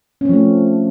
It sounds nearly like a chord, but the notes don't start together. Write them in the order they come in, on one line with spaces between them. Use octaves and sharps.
C#4 C4 F3 A3